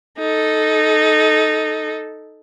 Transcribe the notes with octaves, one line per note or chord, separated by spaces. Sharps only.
D#4 A4